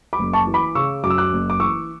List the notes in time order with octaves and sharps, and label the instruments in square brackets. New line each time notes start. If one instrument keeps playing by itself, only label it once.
[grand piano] B5 D6
F#1
A5 C#6
E3
B5 D6
C#3 C#6 E6
F#2 D6
E6
D6 F#6
F#1
D6
E3 C#6 E6